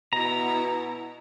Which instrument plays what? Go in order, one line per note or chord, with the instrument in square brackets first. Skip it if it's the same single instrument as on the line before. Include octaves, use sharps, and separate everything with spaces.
[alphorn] B2 [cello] B3 E4 [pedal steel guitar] A#5